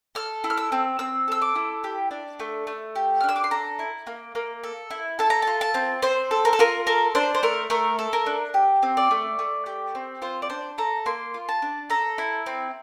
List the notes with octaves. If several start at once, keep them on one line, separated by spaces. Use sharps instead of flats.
A4 F6
E4
F6
E6
C4
C4 E6
A4 E6
D6
E4
G4
D4
A3
A3
G4
F6
D4 E6
D6
C6
A4 A#5
E4
A#3
A#3
A4
E4
A4 A5
A#5
F4 A5
A5
C4
C4 C5
A4
A#4
A4
F4 A#4
A4 A#4
D4 C5
C5
A3 A#4
A3 A#4
A4
A#4
D4
G4
C4
D5
A3
A3
G4
C4
F4 C5
D5
D4 C5
A4 A#5
A#3 C6
F4
A5
D4
A4 A#5
E4
C4